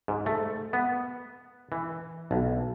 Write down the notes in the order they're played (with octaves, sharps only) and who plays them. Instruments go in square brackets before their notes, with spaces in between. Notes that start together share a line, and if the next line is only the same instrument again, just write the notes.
[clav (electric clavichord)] G#2
A3
B3
E3
B1